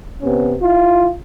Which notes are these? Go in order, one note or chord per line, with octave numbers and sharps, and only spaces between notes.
C3 B3 C#4
E4 F4